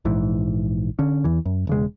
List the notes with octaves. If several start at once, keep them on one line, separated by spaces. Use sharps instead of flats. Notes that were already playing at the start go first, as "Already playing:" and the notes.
A#1 G#2 E3
D3 C#4
E2 E3
F#2
E1 C#3 G#3